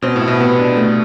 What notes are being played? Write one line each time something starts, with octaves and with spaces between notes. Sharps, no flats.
B2 C4
A2
E4
B2
C3 B3
D4
A3